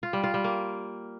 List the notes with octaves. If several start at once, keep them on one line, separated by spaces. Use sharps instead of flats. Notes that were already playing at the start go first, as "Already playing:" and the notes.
F4
G3
F4
G3
A#3